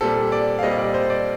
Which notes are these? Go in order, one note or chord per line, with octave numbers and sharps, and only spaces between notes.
A#2 G3 C4 A4
D5
F5
A#2 G3 C4 D#5
D5
C5
D5